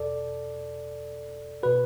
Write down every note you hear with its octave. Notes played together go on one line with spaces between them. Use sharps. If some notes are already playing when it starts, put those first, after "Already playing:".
Already playing: E2 B2 A4 D5
B2 F#4 B4